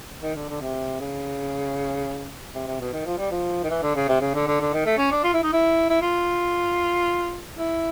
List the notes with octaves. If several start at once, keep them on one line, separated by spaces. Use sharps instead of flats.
D#3
D3
D3
C3
C#3
C3
C3
B2
D#3
F3
G3
F3
D#3
E3
D3
C#3
C3
C#3
D3
D3
D3
D#3
A3
C#4
D4
F4
E4
D#4
E4
E4
F4
E4